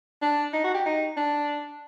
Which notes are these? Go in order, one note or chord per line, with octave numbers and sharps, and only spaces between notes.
D4
D#4
F#4
G4
D#4
D4